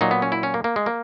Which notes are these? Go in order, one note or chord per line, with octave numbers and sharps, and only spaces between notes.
A#2 F#3 D#4
B3
C#4
E4
C#4
A#3
A#3
G#3
A#3